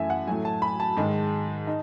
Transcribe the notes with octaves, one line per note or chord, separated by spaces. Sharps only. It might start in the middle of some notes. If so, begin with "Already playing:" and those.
Already playing: F#2 E3 A3 E5 G#5
F#5
A2 F#3 A3 G#5
A5
B5
A5
G#2 D#3 G#3
D#4